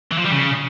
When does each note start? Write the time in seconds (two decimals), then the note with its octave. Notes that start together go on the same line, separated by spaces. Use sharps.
0.11 E3
0.18 F3
0.25 G3
0.31 C#3